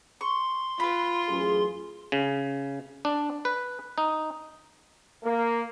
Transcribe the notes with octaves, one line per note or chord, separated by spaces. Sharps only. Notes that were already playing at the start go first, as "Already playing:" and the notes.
C6 C#6
F4 B4 B5
A1 F#2 G#4
C#3
D4
B4
D#4
A#3